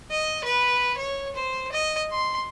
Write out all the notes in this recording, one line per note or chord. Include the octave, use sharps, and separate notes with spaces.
D#5
B4
C#5
C5
D#5
C6